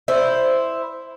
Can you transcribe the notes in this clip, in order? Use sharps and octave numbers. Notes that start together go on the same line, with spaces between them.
E4 C5